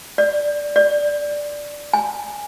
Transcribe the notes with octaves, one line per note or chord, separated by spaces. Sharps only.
D5
D5
G#5